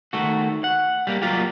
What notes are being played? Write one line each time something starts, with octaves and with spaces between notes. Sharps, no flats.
D#3 A3 F#4
F#5
G3 A#3
F#3 A#3 F4 G4